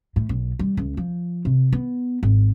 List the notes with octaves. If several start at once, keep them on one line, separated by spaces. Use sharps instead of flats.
A2
B1
G3
C#2
F3
C3
B3
G#1